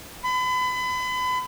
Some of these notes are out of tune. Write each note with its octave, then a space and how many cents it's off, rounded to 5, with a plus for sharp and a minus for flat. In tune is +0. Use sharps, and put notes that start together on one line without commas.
B5 +35